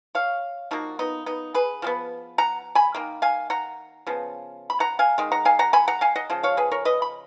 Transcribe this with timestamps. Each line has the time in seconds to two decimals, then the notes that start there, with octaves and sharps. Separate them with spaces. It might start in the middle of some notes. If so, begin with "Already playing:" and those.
0.15 C#5 F5
0.71 F3 A#3 D#4 F#4
0.99 B3 D#4
1.26 B3 D#4
1.54 G#4 B4
1.82 F3 G#3 B3
2.38 F#5 A#5
2.75 G#5 B5
2.95 D#3 A#3
3.22 F5 G#5
3.50 F#5 A#5
4.07 C#3 F3 B3
4.70 B5
4.80 F#5 A#5
4.99 F5 G#5
5.18 D#3 G#3
5.32 F#5 A#5
5.45 F5 G#5
5.59 F#5 A#5
5.73 G#5 B5
5.88 F#5 A#5
6.01 F5 G#5
6.16 D#5 F#5
6.30 C#3 F3
6.43 C#5 F5
6.57 G#4 B4
6.72 A#4 C#5
6.85 B4 D#5
7.02 B5